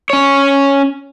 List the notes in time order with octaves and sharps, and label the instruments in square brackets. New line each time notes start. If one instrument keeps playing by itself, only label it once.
[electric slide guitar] C#4 C#5